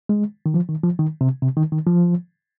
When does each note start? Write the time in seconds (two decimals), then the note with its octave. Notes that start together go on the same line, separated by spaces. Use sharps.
0.09 G#3
0.46 D#3
0.54 F3
0.69 D#3
0.83 F3
0.99 D#3
1.21 C3
1.42 C3
1.57 D#3
1.72 D#3
1.87 F3